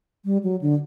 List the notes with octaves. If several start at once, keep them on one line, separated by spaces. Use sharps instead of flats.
G3
F#3
D3